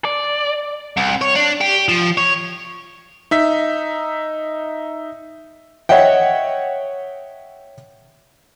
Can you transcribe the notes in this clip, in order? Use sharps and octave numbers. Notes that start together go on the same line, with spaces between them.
D5
C2
C#5
D4
G4
F3
C#5
D#4 E5 B6
C#5 D#5 E5 F#5 G5